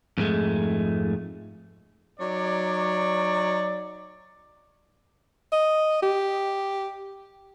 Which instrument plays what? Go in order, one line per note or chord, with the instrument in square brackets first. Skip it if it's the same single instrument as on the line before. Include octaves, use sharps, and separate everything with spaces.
[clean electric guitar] F2 G#2 D#3 G#3 A3
[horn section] F#3 D#4 C#5 D5
[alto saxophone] D#5
G4